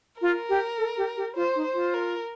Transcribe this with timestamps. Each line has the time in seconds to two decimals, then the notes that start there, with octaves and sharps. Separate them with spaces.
0.22 F4 A#4
0.49 G4
0.78 A4
0.97 G4
1.17 G4
1.36 F4 C5
1.56 D#4
1.65 C5
1.74 F4
1.94 A#4